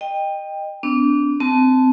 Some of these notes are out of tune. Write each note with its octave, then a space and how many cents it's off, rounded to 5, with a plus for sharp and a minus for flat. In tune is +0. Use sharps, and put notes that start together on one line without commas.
D#5 -15 G5 +15
B3 +30 D4 -25
C4 -20 A5 -10